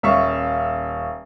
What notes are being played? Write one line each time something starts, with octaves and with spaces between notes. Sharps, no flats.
D#1 E5 F5 C#6